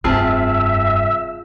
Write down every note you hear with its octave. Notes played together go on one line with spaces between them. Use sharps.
F1 G2 C4 F4 G#4 E5 A5